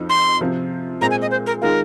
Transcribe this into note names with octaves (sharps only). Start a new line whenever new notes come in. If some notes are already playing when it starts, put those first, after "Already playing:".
Already playing: F2 F3 C4 D#4
C6
C3 F3 C4
A#2 G#3 C4 A#5
G#5
D#5
C5
A#4
D#3 G#3 F4 A#4